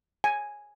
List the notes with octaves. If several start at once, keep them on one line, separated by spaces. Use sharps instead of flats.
G#5